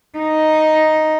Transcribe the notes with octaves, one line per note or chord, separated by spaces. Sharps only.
D#4